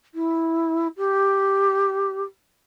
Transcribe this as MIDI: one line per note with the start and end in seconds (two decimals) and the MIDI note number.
0.14 0.88 64
0.97 2.22 67